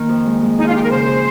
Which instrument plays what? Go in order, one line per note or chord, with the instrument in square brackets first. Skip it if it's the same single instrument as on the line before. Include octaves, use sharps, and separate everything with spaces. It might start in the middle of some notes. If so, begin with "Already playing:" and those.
Already playing: [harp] D#3 A#3
F2
G#3
G#3
[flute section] D#4 [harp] G#4
[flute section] F4
[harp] D#4 [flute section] G4
[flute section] A#4
[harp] C#3 [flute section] C5
[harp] G#4